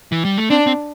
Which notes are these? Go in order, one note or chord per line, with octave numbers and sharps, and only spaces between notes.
E3
G3
A3
C4 D4
C4